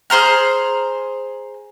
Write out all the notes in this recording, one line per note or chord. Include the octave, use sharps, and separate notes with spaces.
G#4 C5 A#5 F6